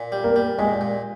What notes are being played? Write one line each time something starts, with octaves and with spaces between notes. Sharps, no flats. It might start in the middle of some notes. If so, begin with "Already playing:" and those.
Already playing: A#2
G3
A#3
G3
A#2 G#3
A#2